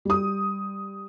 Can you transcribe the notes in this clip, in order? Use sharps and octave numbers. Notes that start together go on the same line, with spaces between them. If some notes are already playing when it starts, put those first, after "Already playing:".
G3 D#6